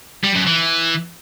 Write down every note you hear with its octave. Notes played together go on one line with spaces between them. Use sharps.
G3
F#2
E3